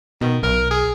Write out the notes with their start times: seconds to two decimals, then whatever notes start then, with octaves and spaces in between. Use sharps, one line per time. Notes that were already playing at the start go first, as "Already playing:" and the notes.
0.21 B2 D#3
0.43 B1 A#4
0.70 G#4